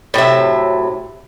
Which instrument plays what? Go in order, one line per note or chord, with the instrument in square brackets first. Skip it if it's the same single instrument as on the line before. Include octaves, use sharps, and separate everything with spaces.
[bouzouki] A2 C3 F#3 E5